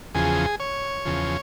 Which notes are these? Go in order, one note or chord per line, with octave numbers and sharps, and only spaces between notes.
E2 C#3 F3 G#4
C#5
E2 C#3 F3